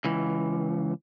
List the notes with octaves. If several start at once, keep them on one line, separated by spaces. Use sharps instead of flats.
C#2 E3